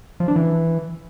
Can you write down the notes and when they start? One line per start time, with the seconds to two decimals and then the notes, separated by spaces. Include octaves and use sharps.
0.20 F3
0.28 D4
0.36 E3